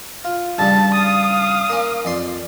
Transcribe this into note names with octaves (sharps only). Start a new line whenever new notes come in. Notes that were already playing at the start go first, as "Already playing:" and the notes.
F4
G2 C#3 G3 A5
F5 D#6
A#3 C#4
F2 D5 C6